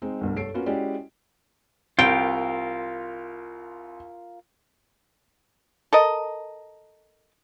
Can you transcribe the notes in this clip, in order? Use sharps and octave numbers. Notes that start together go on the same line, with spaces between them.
G#3 C4 D#4
G1 C2 G2
G2 A4 C#5 C7 D7
A#3 B3 C#4 F4 F#4
G#3 C#4 E4 F#4 G4 D5
C2 F4 A#4 G5
A4 A#4 D#5